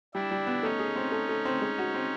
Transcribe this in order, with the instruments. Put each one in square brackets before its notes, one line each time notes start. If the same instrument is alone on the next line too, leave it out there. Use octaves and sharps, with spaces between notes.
[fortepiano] G3 [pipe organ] D4 E4
[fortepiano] G3
B3
[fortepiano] A3 [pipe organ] C#4 D#4
[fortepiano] G#4
C4
A3
A3
C4
G#3
F#4
C4